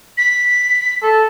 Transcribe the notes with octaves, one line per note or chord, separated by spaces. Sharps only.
B6
A4